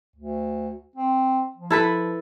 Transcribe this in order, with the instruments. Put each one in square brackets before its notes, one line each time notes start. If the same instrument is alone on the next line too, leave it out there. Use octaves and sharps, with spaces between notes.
[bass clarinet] D2
C4
F3
[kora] E4 A4 B4